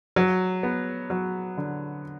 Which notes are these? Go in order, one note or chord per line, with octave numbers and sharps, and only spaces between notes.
F#3
B3
F#3
D3